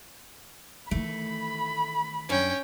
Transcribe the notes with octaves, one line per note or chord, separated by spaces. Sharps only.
D#3 E3 A3 B5
F#2 D3 C#4 G5